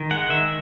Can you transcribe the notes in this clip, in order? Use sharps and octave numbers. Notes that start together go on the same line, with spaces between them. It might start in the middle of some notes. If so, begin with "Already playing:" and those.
Already playing: D#3
G#3 F#5
D#3 E5